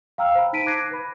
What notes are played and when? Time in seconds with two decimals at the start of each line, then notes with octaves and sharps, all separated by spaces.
0.18 F5 G5 A#5 E6 F6
0.35 C5 G5 B5
0.53 D#4 A5 B6 D7 D#7
0.66 D6 F#6 G#6 A#6 C7 D7
0.91 B4 B5